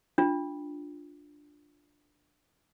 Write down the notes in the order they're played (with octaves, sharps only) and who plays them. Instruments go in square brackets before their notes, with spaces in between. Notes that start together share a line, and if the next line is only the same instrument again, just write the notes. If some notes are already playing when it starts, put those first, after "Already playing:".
[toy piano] D4 F4